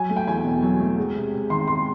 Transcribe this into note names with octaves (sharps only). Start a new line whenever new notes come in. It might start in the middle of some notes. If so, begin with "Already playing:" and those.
Already playing: F#3 G#5
A3
G5
E2 G#5
B2
F#3
A3
G#3
C3
C3
D#3 C6
G#3 C6